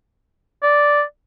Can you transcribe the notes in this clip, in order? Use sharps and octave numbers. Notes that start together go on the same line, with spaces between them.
D5